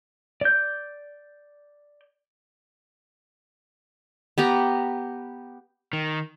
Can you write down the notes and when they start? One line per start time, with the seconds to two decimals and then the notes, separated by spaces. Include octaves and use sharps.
0.41 D5 G6
4.38 B3 G4 A#5
5.93 D#3